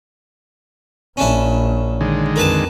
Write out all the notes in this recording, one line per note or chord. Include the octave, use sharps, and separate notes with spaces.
A#1 C#4 D4 E4
D3 D#3 G#3
F2 A#4 B4 A5